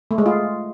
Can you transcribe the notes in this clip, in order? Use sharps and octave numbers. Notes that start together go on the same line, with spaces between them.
A3
G#3
F4